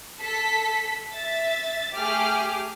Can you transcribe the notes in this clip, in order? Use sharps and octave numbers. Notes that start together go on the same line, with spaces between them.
A4 B6
E5 A6
A3 G4 G#4 D6 F6